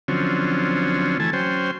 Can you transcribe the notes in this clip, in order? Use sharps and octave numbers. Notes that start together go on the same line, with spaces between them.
D3 F3 F#3 C4 C#4
E3 A3 G#5 A5
F#3 C#4 C5 G5